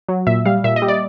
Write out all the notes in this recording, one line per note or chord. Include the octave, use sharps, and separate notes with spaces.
F#3
A#2 E5
G3 F5
A#2 E5
D#5
G3
D5